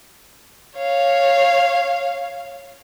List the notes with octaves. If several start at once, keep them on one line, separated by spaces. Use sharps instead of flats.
C#5 F5